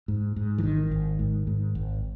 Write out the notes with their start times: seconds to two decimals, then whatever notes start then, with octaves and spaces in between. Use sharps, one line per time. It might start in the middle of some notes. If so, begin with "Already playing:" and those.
0.08 G#2
0.36 G#2
0.58 E3
0.63 G#1 D#3
0.91 G#1
1.19 G#2
1.47 G#2
1.75 G#1